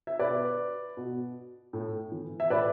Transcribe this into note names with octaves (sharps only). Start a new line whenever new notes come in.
E5
B2 B4 D5
B2
A2
E3
E5
A2 B4 D5